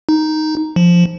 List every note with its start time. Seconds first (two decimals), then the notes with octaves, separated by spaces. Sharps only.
0.09 D#4
0.76 F3